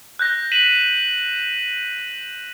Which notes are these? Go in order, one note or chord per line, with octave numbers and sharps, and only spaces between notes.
F#6 G6 A#6
B6 D#7 E7 F#7